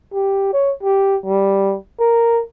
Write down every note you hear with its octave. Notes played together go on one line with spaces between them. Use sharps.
G4
C#5
G4
G3
A#4